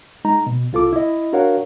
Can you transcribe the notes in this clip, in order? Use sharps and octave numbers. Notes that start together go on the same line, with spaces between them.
G#3 D#4 A#5
B2
C2 F4 A4 D6
E4 D#5
D4 F#4 A#4 C#5 F5 F#5